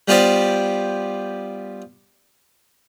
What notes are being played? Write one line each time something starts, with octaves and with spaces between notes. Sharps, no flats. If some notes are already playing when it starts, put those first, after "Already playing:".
G3 B3 F4 G4 C5 D5